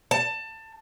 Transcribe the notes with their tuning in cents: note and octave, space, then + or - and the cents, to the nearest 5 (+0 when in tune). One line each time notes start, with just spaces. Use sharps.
A5 +20